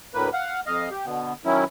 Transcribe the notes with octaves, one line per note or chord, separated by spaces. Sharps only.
D2 A2 A#3 B4
F5 F#5
F2 D#5 F5
G4
B2 D3 B3
D#3 F#3 C#4 E4